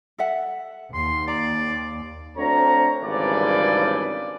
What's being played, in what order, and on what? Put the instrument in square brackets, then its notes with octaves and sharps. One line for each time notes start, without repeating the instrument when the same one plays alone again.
[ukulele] A4 E5 F#5
[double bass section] D#2 [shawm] C6
[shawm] D5 [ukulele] A#5
[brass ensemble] D2 D3 C4 C#5 A#5
G#1 G2 C#3 E3 D5